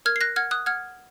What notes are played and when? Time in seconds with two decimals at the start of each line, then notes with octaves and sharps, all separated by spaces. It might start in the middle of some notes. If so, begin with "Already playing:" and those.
0.05 A#4 F6 G#6
0.16 C7
0.21 F#6 A#6
0.36 F#5 F6 G#6
0.51 D#6 F#6
0.66 F#5 F6 G#6